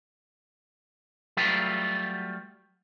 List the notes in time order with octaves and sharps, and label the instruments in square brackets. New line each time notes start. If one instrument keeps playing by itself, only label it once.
[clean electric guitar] F#3 G3 A3 F4 B4